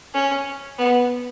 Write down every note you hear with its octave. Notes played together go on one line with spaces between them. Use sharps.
C#4
B3